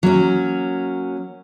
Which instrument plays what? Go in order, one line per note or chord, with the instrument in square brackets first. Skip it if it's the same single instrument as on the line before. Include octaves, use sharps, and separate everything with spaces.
[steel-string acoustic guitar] F#3 A#3 C#4